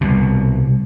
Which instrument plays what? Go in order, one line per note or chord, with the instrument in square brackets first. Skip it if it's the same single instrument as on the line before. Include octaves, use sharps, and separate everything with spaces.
[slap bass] C2 B2